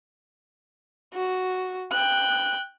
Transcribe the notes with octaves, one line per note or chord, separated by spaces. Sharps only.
F#4
G5 F#6